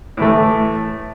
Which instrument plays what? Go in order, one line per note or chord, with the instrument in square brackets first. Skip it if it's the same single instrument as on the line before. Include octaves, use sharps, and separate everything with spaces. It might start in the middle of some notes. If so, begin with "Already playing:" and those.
[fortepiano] A2 E3 A3